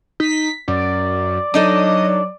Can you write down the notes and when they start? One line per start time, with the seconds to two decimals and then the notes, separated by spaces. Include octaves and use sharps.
0.20 D#4 B6
0.68 F#2 D5
1.54 F#3 D4 D#4 A4 D#5